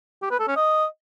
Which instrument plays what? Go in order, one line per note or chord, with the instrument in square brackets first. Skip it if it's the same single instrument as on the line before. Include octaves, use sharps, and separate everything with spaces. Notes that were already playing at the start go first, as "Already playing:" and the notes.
[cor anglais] G4
B4
A4
C#4
D#5